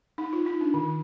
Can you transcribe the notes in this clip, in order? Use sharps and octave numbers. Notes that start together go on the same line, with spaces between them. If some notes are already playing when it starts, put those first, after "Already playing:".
D#4
F4
D#4
D4
D#3